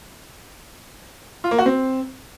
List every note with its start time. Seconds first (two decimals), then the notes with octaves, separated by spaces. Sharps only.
1.44 F4
1.51 A#3
1.59 F#4
1.66 C4